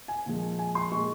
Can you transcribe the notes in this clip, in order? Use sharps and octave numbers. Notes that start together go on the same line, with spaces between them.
G#5
A#2 F3 G#3
G#5
C6
A#2 G#3 C#6